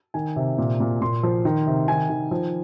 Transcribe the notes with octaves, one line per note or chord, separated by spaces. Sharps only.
D#3 G#5
C3
A#2
A#2
A#2 C6
F3
D#3
C3
D#3 G#5
D#3
F3